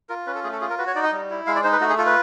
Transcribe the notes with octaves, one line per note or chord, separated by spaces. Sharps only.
F4 A#4
C#4 B4
A4
A3 G#4
A4
F4 G#4
A#4
F#4 B4
C#5
D#4 D5
D#5
G3
E4
G#3 F5
D5
D#4 C5
B4
A3 F#4
G#4
F4 A4
B4